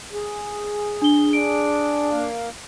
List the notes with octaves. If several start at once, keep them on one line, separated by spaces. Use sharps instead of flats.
G#4
D4 G7
D4 D7
A#3 F5